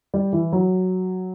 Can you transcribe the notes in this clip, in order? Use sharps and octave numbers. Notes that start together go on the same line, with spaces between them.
G3
E3
F#3